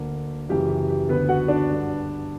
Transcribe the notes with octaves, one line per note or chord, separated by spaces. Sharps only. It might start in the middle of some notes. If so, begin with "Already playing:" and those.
Already playing: D2 D3 A#3
F#2 C#3 E3 G4
G4
G4
D2 D3 B3 B4
F#4 F#5
D4 D5
G2 D3